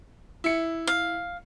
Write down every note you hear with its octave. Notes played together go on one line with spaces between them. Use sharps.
E4 C#7
F5